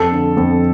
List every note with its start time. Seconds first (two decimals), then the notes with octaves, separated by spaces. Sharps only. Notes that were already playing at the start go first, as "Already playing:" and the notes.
Already playing: F2 A4
0.12 D3
0.37 F2